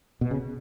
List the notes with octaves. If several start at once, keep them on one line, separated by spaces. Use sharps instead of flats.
B2
C#3